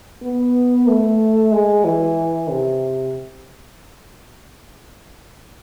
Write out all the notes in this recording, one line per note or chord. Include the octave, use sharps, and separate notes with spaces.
B3
A3
G#3
E3
C3